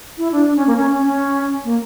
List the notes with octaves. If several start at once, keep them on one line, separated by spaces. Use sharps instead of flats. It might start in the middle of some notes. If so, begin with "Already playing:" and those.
E4
D4
D4
C#4
A#3
C#4
C#4
C#4
A#3